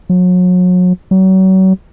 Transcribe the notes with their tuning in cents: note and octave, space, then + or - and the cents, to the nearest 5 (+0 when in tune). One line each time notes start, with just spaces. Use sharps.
F#3 -35
F#3 +35